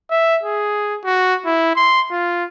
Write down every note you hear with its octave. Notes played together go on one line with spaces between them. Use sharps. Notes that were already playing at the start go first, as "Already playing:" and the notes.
E5
G#4
F#4
E4
C6
F4